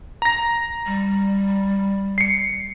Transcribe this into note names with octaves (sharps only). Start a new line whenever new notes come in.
A#5 A#6
G3
C7 C#7